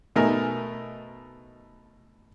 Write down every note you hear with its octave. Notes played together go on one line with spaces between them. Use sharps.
B2 A3 D#4 A#4 G#5